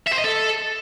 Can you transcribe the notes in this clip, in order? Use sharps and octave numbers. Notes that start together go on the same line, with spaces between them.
E5
C5
D#5
A4